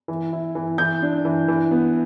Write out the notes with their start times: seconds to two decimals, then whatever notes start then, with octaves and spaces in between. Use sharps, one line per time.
0.08 E3
0.33 E4
0.55 E3
0.78 E3 G6
1.02 D4
1.25 E3
1.48 E3
1.71 B3